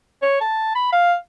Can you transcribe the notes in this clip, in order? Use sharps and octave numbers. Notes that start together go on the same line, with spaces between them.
C#5
A5
B5
F5